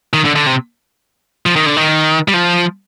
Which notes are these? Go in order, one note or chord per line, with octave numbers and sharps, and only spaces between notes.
D#3
D3
D3
C3
F3
D#3
D3
D#3
G3
F3